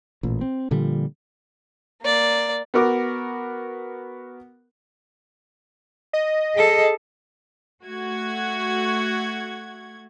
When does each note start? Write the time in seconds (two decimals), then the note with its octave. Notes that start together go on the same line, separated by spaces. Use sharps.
0.23 A1 A#2
0.41 C4
0.71 A#2 D3 F3 G3
2.02 A#3 D5
2.74 B3 F#4 A#4 D6
6.13 D#5
6.56 G#4 A4
7.84 A3 F#4 G#6